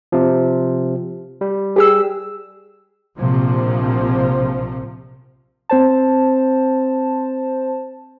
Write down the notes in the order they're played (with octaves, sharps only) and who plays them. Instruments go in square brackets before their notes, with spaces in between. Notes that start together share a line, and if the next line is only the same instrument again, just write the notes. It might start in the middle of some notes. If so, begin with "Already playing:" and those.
[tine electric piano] C3 F3
G3
[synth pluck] G4 G#4 E6
[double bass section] A#1 C3 F3
[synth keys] C4 C5 A5